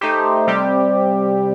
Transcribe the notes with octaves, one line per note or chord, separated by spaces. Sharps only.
A3 D#4 G4 C5
C3 G3 C4 G4